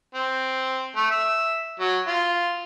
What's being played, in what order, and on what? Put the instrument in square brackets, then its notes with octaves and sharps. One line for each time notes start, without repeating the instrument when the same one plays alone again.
[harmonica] C4
A3
E5
F#3
F4